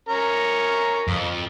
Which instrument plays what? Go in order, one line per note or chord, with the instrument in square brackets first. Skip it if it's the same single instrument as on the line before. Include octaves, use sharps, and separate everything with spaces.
[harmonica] C#4 A#4
[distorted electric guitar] F2